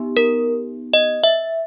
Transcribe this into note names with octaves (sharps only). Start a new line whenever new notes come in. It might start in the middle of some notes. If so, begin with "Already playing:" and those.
Already playing: B3 D#4 G4
A#4
D#5
E5